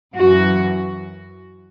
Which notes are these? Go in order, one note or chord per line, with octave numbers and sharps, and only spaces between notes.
F#2 E3 F#4